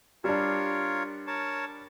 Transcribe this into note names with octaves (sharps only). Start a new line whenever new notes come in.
G3 D4 F4 A#4 C#5
A#4 C#5 A5